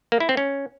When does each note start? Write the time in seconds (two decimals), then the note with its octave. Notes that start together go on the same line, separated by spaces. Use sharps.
0.12 A#3
0.20 E4
0.29 C4
0.37 C#4